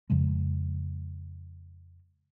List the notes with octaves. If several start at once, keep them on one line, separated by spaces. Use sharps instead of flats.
F2 C#3 F3 G#3